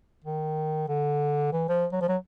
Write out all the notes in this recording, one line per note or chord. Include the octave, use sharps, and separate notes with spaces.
D#3
D3
E3
F3
F#3
F3
F#3